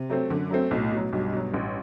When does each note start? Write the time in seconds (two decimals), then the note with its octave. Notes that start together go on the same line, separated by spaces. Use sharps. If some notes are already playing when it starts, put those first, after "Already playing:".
Already playing: C3
0.10 F#3 A3 C4
0.30 F#2 D3
0.50 F#3 A3 C4
0.71 B1 A2
0.91 B2
0.97 F#3
1.13 B1 G2
1.33 B2 F#3
1.54 A1